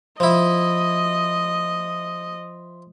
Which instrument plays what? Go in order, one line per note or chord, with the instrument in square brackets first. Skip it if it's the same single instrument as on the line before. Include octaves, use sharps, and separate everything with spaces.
[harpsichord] F3 E4 [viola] D#5